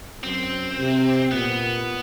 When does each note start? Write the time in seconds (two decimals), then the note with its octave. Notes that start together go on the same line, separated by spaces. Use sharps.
0.24 F#2 C4
0.78 C3
1.32 A#2 B3